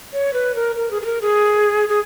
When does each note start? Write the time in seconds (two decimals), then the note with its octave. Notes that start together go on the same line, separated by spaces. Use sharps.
0.13 C#5
0.33 B4
0.55 A#4
0.76 A#4
0.91 G#4
1.02 G#4
1.06 A#4
1.21 G#4
1.89 G#4